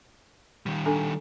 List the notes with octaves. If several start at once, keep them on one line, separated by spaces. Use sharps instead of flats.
D#3 G3
D4 A4 G#5